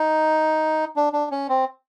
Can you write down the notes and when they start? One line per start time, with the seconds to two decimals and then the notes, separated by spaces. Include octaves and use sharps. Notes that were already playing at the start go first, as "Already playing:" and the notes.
Already playing: D#4
0.96 D4
1.13 D4
1.31 C#4
1.49 C4